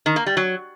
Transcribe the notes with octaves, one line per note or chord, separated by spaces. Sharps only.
D#3
A#3
G3
F#3